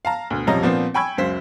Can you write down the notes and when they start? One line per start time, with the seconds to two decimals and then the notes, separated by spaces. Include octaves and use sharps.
0.05 F5 A5 A#5
0.30 D2 B2
0.47 D#1 C3 F3 C#4 D#5 A#5
0.63 A#2 F3 B3 C4 D4
0.94 G5 G#5 B5 C#6 E6 G#6
1.17 C#2 F#2 C5 B6